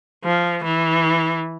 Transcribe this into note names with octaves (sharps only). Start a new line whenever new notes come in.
F3
E3